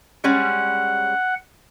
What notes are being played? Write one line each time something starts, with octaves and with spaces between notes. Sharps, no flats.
G3 G#3 C#4 F#5